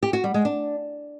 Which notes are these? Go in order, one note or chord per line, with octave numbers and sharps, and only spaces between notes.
G4
F#4
G3
G#3
D4